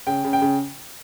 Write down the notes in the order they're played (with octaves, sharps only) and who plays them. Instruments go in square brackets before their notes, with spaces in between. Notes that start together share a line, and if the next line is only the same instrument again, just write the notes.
[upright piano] C#3 G5
C#3
G5
C#3